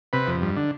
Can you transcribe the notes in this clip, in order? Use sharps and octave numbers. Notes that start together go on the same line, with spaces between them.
C3 B4
F2
G2
D3